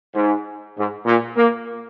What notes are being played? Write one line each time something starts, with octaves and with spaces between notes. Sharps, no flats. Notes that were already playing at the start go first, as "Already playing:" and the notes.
G#2
G#2
A#2
A#3